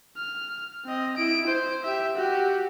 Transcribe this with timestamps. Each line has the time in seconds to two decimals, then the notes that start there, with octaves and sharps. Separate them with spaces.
0.17 F6
0.85 C4 D#5
1.17 E4 D7
1.47 C5
1.84 G4 E5
2.15 F#4 G4